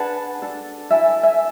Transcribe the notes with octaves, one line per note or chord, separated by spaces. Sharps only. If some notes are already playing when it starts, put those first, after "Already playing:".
Already playing: D4 G#4 B4 F#5 A5
D4 A4
E4 A4 E5 G#5
E5 G#5